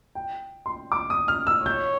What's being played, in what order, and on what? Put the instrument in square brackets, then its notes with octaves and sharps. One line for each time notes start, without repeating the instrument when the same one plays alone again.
[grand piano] G5
C6
D6
D#6
F6
E6
[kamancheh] C#5 [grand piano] G6